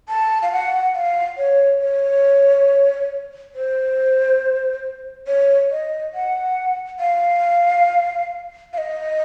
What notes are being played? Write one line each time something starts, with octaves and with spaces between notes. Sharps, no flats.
A5
F5
F#5
F5
C#5
C#5
C5
C#5
D#5
F#5
F5
F5
D#5